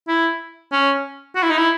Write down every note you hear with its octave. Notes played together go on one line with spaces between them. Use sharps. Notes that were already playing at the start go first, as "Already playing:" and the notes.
E4
C#4
F#4
E4
D#4
E4